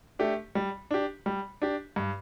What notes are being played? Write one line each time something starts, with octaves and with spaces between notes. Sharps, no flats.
A3 D4 G4
G3
D4 G4
G3
D4 G4
G2